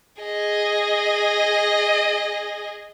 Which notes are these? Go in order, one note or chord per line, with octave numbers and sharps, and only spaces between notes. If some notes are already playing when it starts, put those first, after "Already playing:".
G#4 D#5